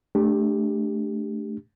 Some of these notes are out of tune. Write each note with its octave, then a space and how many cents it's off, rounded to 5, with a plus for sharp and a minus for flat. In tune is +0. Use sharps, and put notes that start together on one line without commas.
A3 -15 D4 +0 G4 +10